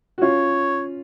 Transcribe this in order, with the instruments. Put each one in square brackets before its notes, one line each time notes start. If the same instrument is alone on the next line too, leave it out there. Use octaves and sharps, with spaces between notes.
[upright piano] F#4
[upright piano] C#4 F4 [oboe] C#5